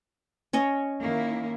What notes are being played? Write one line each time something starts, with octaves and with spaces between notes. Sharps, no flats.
C#4 C#5 D#5
D#3 A#3 E4